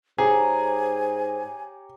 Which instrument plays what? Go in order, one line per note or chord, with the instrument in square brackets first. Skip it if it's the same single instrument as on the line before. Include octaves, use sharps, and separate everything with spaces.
[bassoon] G#2 [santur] G4 C#5 A#5 [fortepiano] G#4 [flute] G#5